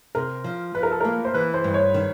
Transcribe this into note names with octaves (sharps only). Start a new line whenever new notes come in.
C3 A#4
F3
F3 B4
A#4
A4
A#3 A#4
C5
E3 B4
C5
G2
C#5
D#3